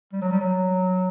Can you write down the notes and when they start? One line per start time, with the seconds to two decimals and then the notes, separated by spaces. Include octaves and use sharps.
0.13 G3
0.22 F#3
0.31 G3
0.41 F#3